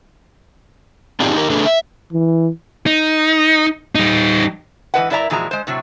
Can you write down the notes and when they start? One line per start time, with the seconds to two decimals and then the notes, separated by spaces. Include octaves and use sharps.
1.20 C4 D4 D#4 F4 G4 G#4
1.34 D#4 G4 A#4
1.50 A3 D4 G#4 A4 B4
1.65 E5
2.13 E3
2.86 D#4
3.95 G3 D#4
4.94 G#2 E3 G#3 B4 D#5 F#5
5.10 G2 E4 A#4 D5 E5 A#5
5.30 A#2 E3 F3 G#3 F#4 A#5
5.51 G#3 C5
5.67 A2 C3 F#3